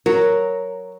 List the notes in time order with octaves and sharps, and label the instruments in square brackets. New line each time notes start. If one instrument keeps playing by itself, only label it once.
[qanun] F#3 [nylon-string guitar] A#4